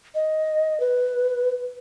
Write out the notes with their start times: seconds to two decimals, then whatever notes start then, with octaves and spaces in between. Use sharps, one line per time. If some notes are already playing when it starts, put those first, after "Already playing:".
0.15 D#5
0.80 B4